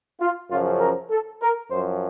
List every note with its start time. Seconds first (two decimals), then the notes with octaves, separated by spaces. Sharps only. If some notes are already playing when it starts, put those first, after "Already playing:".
0.20 F4
0.50 F#2 C#3 F3 F4
0.81 A#4
1.11 A4
1.42 A#4
1.71 F#2 F3 C5